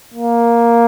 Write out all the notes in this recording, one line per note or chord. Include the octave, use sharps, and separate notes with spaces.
A#3